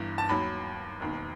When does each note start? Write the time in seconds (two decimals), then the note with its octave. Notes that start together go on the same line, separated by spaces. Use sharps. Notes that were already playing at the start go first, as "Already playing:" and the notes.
Already playing: G1 G2 E3
0.18 A5
0.29 D#2 D#3 F#3 B5
1.00 E1 D#2 D#3